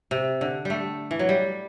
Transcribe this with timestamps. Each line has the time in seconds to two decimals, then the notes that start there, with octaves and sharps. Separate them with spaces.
0.11 C3
0.41 D3
0.65 G3 A3
1.11 E3
1.19 F#3
1.29 G3